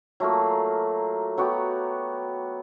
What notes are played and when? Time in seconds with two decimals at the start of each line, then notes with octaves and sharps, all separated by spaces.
0.20 F#3 A3 A#3 F4
1.38 F#3 B3 F#4 G4